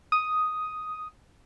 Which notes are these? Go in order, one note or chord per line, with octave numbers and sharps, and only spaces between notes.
D#6